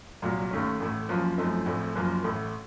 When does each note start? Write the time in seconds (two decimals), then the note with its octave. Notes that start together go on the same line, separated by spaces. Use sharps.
0.22 C2 A#2 F#3
0.51 D#2 D#3 A3 C#4
0.80 A1 A2 A3
1.09 F#1 F#2 F3 A#3 C#4
1.38 F#2 F3 A3 C4 D#4
1.66 A#1 A2 A3 C4
1.95 F#1 F#2 F3 A#3
2.24 A1 A2 A3